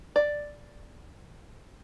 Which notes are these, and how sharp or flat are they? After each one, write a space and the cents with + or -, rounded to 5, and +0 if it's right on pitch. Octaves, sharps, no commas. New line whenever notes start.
D5 +0